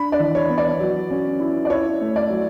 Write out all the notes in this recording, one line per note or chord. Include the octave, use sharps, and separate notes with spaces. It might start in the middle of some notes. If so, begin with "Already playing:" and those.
Already playing: D4 B5
D5
E3
C#5
B3
D5
F#3
C#4
E4
D5
E4 C#5
A3
D5
F#3